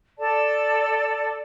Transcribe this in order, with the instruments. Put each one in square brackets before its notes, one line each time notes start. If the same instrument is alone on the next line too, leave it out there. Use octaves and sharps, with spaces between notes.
[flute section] A4 D5 A5